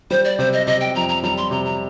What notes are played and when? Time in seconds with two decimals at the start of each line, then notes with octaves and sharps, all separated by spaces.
0.11 G3 C5
0.25 D5
0.39 C3 C5
0.53 D#5
0.67 C3 D#5
0.81 G5
0.95 F2 A#5
1.09 A#5
1.23 G3 A#5
1.37 C6
1.51 C3 A#5
1.65 A#5